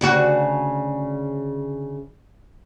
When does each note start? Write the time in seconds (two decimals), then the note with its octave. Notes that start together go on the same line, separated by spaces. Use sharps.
0.01 D2 C#3 F#4